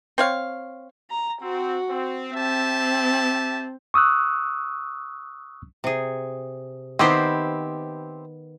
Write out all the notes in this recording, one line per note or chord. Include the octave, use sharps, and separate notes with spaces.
C4 C#5 F5
A#5
C4 F#4
C4
C4 G4 E5 A5
C#6 D#6 E6 F#6
C3 G#4
D#3 B3 C4 E4 G4 C5